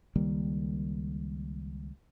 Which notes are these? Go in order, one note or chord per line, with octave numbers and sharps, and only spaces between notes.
C#2 D#3 G3 A#3